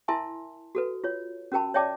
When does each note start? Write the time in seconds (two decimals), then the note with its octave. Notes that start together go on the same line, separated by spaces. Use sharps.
0.08 E4 A#4 E5 G#5 A5 C6
0.75 F#4 A4 B4
1.04 F4 C#5
1.52 C#4 F#4 A#4 G5 A5 B5
1.74 C#5 D5 E5 G5 A5 D6